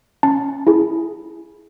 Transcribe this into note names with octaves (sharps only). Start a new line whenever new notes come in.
C#4 A5
E4 G#4